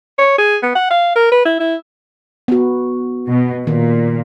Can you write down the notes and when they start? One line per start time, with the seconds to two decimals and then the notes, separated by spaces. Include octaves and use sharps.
0.19 C#5
0.38 G#4
0.63 B3
0.75 F#5
0.91 F5
1.16 A#4
1.32 B4
1.45 E4
1.60 E4
2.48 B3 F#4
3.31 B2
3.67 A#2 D#3